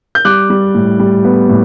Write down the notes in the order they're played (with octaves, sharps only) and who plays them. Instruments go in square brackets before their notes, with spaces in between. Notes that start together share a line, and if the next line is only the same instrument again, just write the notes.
[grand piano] G6
G3 D6 F#6
G3
A2
G3
B3
A2